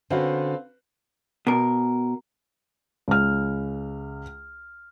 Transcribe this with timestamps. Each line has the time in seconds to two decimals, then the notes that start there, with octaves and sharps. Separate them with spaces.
0.10 D3 C4 C#4 F#4 B4 F5
1.47 B2 A#4
3.08 C#2 F6